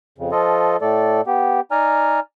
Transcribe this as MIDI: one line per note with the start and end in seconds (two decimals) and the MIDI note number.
0.18 0.31 41
0.18 0.31 49
0.32 0.77 53
0.32 0.77 65
0.32 0.77 69
0.32 0.77 75
0.81 1.21 45
0.81 1.21 57
0.81 1.21 69
0.81 1.21 74
1.27 1.61 59
1.27 1.61 67
1.71 2.20 63
1.71 2.20 74
1.71 2.20 80
1.71 2.20 82
1.71 2.20 89